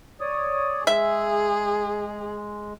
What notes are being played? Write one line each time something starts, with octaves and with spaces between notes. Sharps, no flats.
C#5 D5 D#6
G#3 G#4 E5